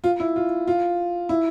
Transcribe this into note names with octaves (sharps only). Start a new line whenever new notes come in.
F4
E4
F4
F4
E4